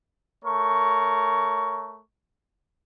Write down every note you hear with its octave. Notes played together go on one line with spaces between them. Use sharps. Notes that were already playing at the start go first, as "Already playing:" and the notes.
A3 A#4 C#5 C#6